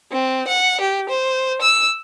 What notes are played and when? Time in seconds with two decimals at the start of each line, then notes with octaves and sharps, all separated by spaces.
0.12 C4
0.48 F#5
0.81 G4
1.09 C5
1.62 E6